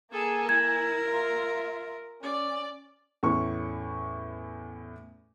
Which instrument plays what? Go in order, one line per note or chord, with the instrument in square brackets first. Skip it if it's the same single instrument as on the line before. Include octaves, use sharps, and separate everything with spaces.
[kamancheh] A#3 G#5 [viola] G#4 A4
[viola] E4 [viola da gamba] A#4 [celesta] G#6
[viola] F4 [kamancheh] E5
[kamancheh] C#4 [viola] D5
[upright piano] E2 A2 C#4 C#6